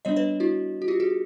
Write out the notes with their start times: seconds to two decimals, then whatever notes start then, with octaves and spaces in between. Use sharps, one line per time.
0.05 G3 B3 D4 C#5 D#5
0.16 B4 C#5
0.40 E4 F#4
0.82 F#4
0.88 F4 G4
1.00 F#4 G#4